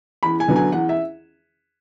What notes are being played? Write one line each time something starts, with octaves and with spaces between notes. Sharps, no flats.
E2 B5
G#5
D3 F#3 B3
G#5
E2 F#5
E5